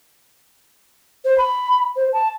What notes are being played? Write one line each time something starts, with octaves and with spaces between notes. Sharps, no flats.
C5
B5
C5
A5